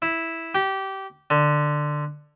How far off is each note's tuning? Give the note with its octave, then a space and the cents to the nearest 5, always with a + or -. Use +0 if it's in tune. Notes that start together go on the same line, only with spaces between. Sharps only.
E4 -5
G4 -20
D3 +15